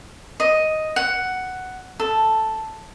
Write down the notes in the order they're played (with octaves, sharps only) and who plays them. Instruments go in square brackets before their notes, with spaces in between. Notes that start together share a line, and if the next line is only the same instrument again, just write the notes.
[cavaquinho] D#5
F#5
A4